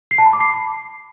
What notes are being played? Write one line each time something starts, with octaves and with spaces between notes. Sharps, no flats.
C7
A5
B5
D6
C7